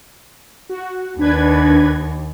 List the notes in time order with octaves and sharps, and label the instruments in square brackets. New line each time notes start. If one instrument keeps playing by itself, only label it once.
[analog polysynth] F#4
[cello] D#2 [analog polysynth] D4 B4 G#6